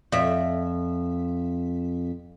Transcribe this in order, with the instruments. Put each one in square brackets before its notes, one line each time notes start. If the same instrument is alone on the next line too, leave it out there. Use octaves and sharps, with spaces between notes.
[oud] F2 E5